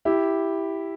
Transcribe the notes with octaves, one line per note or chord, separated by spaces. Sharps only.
E4 G4